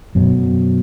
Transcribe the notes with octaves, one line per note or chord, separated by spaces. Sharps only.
F#2 B2